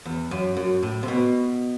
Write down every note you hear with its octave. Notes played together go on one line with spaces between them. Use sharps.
E2
F#2
F#2
A2
C3
B2